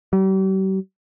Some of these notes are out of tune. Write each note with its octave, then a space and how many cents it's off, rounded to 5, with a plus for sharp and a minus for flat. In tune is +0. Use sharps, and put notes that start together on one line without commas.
G3 -45